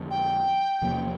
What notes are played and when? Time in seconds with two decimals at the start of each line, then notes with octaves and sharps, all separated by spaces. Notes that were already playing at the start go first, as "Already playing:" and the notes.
Already playing: F2 D3 G3
0.10 G5
0.82 E2 C3 F3 A#3